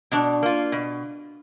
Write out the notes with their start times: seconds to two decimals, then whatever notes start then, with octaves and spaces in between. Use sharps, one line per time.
0.12 B2 D4
0.42 A#3 F4
0.72 B2